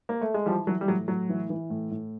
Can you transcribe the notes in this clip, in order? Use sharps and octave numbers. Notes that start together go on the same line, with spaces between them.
A#3
A3
G#3
E3 F3 G3
E3 F#3
G3
A2 F#3
A2 F#3
E3
E3
A2
A2